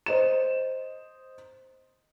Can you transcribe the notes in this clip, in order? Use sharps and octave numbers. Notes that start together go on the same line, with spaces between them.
C5 D#5 E7